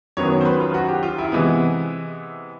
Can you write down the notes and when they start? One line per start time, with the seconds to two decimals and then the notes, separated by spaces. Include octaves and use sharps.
0.17 F#2 D#3 F#3 B3 C#5
0.41 C5
0.45 B4
0.60 F4
0.74 F#4
0.88 G4
1.03 F4
1.18 E4
1.32 C3 E3 G#3 B3